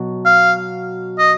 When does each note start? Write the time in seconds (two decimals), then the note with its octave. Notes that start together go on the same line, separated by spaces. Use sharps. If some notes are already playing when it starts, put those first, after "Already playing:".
Already playing: B2 F#3
0.25 F5
1.19 D#5